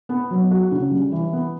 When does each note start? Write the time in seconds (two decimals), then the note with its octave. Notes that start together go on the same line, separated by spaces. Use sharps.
0.09 B3
0.30 F#3
0.51 F#4
0.72 C#3
0.91 G3
1.12 E3
1.33 B3